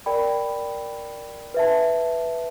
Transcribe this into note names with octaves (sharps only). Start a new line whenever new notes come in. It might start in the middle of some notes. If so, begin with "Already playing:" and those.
A#4 D5 G5 B5
B4 E5 A5